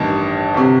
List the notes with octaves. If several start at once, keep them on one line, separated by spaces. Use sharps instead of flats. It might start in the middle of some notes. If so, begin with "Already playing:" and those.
Already playing: A1 G2 D#3
G1 C3